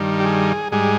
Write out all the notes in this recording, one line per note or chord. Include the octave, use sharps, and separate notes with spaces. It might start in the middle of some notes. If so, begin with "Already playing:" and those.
Already playing: G2 D#3 G3
G4
G#4
G#2 G3 G#4